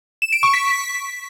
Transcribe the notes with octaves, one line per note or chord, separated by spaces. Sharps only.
E7
D7
C#6
B6